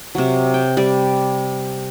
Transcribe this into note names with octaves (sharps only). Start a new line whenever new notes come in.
C3 F#3
G5
G3 D5 D6